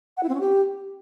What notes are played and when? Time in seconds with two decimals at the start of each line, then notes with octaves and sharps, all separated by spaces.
0.17 F#5
0.23 E4
0.29 C4
0.35 C#4
0.40 G4